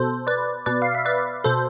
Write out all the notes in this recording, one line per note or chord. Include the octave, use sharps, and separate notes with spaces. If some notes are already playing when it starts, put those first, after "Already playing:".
Already playing: B2 A4 C5
B4 D5
B2 B4 D5
F5
E5
B4 D5
B2 A4 C5